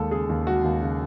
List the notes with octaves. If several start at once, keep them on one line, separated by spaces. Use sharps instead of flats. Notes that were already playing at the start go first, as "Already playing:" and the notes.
Already playing: D#2 G#3 A4
C#3 G#4
D#2
G#3 F#4
D#2
C#3